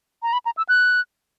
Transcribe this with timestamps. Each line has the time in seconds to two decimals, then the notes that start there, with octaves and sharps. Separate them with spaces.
0.23 A#5
0.33 B5
0.46 A#5
0.57 E6
0.69 F#6